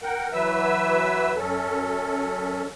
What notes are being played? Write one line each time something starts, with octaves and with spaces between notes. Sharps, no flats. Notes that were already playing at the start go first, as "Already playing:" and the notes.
A#4 F#5 G5
E3 F#3 B4 E5 E6
F#2 C#4 A4